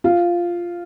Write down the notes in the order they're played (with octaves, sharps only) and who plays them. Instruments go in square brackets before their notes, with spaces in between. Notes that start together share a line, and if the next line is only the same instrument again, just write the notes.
[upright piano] F4